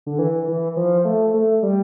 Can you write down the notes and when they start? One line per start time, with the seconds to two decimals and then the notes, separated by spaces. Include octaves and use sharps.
0.06 D3
0.19 E3
0.48 E3
0.77 F3
1.05 A3
1.34 A3
1.63 G3